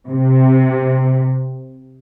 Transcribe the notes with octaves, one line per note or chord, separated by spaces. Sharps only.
C3